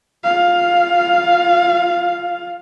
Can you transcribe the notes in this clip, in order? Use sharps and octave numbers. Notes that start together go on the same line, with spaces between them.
F4 F5